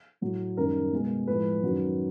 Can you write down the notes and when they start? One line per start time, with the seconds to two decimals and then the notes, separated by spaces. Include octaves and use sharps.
0.21 A2 F#3
0.57 F#2 D#3 G3 A#4
0.92 B2 G#3
1.27 A2 F3 G#3 B4
1.63 F#2 D#3 F#3